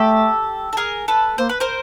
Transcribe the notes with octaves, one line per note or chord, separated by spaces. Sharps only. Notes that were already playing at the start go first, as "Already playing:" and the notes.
Already playing: A3 G4 A4
A4
G#4 A#4
A4 B4
A#3 C5
B4
A#4 C5